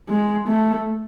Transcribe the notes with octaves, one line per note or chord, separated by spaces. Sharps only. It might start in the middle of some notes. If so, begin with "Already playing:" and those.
G#3
A3